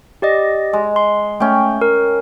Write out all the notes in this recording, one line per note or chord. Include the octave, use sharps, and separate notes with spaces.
G4 D5 D#5
G#3
C6
A3 C#4 G5
A#4